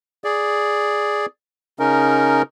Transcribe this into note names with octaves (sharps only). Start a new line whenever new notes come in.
G#4 D5
C#3 C#4 D#4 A#4